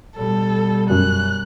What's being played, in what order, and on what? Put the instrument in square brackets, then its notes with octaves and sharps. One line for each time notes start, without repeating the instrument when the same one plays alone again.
[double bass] B2 G3 [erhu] A4
[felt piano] F#2 [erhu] F#6